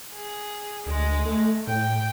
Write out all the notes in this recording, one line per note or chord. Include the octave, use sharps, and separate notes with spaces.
G#4
D2 G#3
A3
A2 G5